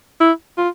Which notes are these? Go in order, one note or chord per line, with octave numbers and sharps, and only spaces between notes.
E4
F4